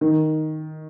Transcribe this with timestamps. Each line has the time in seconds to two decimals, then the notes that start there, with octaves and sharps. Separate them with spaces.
0.01 D#3